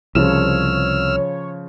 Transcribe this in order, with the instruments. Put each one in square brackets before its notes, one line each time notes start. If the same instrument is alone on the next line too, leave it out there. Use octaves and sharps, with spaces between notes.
[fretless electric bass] C2 [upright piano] C#3 F3 E7 [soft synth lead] C#5 [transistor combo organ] E6 F6